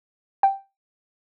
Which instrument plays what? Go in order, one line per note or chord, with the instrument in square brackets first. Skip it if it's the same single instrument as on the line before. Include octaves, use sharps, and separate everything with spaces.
[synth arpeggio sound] G5